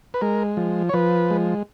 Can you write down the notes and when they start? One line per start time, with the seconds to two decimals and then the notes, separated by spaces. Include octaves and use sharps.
0.14 B4
0.21 G#3 A#4
0.57 F3
0.89 C#5
0.93 F3 B4
1.30 G#3